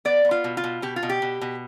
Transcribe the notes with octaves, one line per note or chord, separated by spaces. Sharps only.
B3 D5
B3
F4
B2
F4
B2
B2 G4
F4
B2
G4
B2
B2